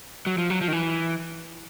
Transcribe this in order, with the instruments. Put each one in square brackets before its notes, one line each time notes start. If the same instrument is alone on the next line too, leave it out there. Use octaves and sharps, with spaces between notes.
[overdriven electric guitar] F#3
F3
F#3
F3
D#3
E3